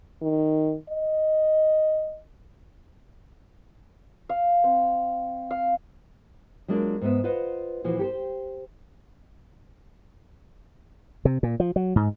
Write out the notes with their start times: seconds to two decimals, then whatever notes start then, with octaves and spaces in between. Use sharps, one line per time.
0.22 D#3
0.89 D#5
4.29 F5
4.64 C4
5.51 F5
6.68 F#3 G#3 A#3 D4 F4
7.01 G#2 G#3 B3 E5
7.24 F4 B4 C5 D#5 F5 F#5
7.84 A#2 E3 F3 F#4
7.99 G4 A4 C5
11.25 C3
11.43 A#2
11.60 F3
11.76 F#3
11.96 G#2